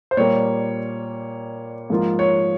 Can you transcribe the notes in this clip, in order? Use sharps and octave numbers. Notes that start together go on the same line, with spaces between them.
C5
A#2 G3 A#3 C#5
G#2 F3 A#3 F4
C#5